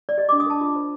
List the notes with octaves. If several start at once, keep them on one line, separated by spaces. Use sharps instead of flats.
D5
G4 D#5
D4 D6
D#6
A#4 A5
F4
C5